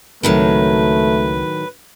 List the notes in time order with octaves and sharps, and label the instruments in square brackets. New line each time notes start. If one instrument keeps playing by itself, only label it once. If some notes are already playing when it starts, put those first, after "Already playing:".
[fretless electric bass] C#2 C4 [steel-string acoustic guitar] A2 D#3 F#3 [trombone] A3 [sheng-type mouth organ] B4